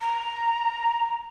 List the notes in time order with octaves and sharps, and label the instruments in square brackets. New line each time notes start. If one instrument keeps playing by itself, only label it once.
[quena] A#5